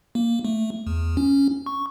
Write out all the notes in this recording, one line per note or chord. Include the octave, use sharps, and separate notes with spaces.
A#3
A3
E2
C#4
C#6